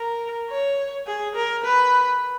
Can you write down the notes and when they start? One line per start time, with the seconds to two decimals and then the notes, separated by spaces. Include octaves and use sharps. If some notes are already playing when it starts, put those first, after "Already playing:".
Already playing: A#4
0.50 C#5
1.07 G#4
1.36 A#4
1.64 B4